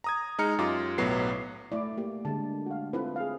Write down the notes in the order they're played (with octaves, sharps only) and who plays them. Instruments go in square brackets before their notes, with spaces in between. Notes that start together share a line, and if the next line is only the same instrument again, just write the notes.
[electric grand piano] A#5 D#6 G#6
G#3 D#4 A#5 F6 C#7
F#2 F4 G4 D6
B1 A2 F#3 B3 B4 C7
[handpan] A3 D5 [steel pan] E4 D6
[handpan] A#3 G4
[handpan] D3 G#3 [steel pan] A5
[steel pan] F#4 F5
[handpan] C4 E4 A4 [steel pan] F4 B4
[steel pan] G#4 F5